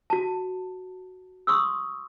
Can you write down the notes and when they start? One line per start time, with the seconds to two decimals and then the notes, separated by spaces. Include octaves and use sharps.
0.10 F#4 A5
1.47 C6 C#6 D#6 E6